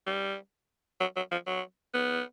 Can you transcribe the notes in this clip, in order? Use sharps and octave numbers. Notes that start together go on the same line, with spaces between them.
G3
F#3
F#3
F3
F#3
B3